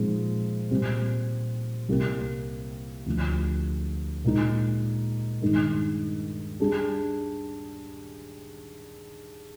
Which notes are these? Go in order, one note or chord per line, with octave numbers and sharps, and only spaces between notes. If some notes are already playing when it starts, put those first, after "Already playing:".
Already playing: A#2 F3 G#3 C4 D#4
A#2 G3 C4
C2 C3 G3 A#3
D2 D3 F3
A#2 G#3 D#4
G2 D#3 G#3
G3 D4 G#4